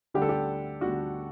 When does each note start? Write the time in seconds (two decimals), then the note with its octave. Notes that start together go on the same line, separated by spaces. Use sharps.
0.14 D2 D3 G3 D4 G4
0.22 A4
0.29 G4
0.81 D2 D3 G3 D4 F#4